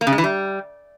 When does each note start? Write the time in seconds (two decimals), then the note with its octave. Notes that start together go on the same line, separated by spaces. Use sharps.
0.01 A#3
0.07 C#3
0.12 G#3
0.18 E3
0.24 G3